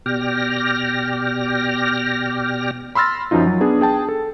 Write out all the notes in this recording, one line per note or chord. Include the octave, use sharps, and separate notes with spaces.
B2 G4 D5 G5 F6 A#6
B5 C6 E6 F6 A6 A#6
F#2 F3 F#3 D#4 F4
F#3
B3 D4 G#4
G#4 G5 A5
A4